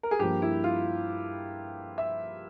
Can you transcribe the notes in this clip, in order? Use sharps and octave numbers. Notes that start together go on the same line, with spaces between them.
A#4
G#4
G2 F3 A#3 G4
E4
F4
E5